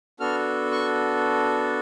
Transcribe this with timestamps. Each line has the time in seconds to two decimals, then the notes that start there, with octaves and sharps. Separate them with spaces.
0.20 B3 D4 F#4 A4 F6
0.72 C#6